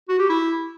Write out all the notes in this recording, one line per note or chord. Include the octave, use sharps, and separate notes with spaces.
F#4
G4
E4